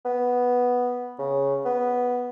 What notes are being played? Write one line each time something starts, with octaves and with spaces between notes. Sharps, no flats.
B3
C#3
B3